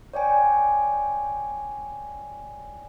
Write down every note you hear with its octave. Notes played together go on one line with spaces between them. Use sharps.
C#5 D5 G5 G#5